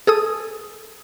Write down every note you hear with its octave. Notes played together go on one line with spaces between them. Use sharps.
G#4 A4 D#6